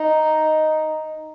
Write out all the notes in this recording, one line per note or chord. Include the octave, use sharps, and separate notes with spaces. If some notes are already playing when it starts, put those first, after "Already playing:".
Already playing: D#4